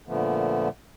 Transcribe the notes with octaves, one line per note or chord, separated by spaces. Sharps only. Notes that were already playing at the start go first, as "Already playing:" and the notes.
A#2 D3 F3 A3 B3